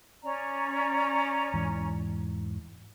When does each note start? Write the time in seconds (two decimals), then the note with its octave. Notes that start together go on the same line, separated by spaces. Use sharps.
0.24 C#4 D5 A#5
1.54 E2 G#2 E3